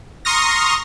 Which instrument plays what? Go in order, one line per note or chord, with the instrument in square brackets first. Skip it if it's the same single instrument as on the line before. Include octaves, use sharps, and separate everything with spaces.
[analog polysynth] A#5 C6 C#6 D#6 F6 A#6